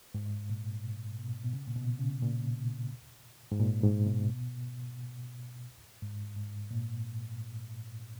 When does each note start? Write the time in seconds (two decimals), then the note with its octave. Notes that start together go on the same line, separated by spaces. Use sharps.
0.14 G#2
0.50 A#2
0.84 B2
1.19 B2
1.44 B2
1.53 C#3
1.67 A#2
1.76 B2
1.99 C#3
2.22 A#2
3.52 G#2
3.60 A#2
3.83 G#2
4.06 B2
6.02 G#2
6.36 G#2
6.71 A#2